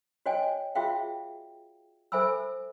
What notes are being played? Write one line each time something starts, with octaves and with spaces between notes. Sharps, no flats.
F#4 C#5 D#5 G5 G#5
F4 F#4 G#4 E5 F5 G5
A4 C5 E5 G#5 B5 E6